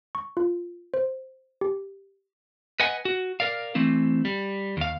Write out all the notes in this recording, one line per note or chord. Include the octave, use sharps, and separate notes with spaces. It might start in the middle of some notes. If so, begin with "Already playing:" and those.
C#6
F4
C5
G4
B4 D#5 F#5 G#5
F#4
A#4 D5 F5
E3 A3 C4 E4
G3
D#2 F5